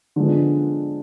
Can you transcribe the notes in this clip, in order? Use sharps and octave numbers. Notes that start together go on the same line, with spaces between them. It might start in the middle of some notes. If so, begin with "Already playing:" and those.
D3 F3 G#3 B3